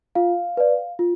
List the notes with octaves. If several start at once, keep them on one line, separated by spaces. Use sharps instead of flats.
F4 F5
B4 D5
F4